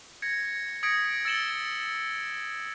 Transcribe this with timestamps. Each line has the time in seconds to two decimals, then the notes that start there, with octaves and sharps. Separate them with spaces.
0.22 G#6 A#6 C#7
0.83 D#6 G#6 A#6 B6 C#7 D7
1.25 E6 A6 C#7 E7 F#7 G7